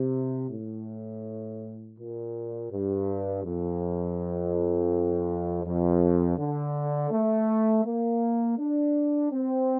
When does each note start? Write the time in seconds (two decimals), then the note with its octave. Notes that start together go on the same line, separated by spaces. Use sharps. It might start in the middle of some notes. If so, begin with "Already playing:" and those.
Already playing: C3
0.50 A2
1.97 A#2
2.71 G2
3.44 F2
5.65 F2
6.38 D3
7.11 A3
7.85 A#3
8.59 D4
9.32 C4